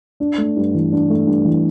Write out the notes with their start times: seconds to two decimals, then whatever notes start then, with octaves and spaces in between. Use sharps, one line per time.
0.20 D4
0.38 A3
0.56 G2
0.74 E3
0.92 D4
1.10 A3
1.27 G2
1.45 E3